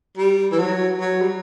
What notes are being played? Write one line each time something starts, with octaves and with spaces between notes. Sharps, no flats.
G3
E3
F#3
F#3
G3